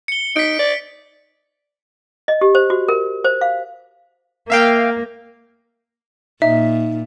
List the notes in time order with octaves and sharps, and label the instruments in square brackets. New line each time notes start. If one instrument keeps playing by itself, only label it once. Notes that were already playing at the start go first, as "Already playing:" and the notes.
[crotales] C#7 G7
[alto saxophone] D#4 [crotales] B6 D7
[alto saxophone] D5
[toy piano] D#5
G4
C5
F#4
A#4
C5
F5
[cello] A#3 [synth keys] E5 F5 G5
[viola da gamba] A#2 [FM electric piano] D#4 [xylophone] E5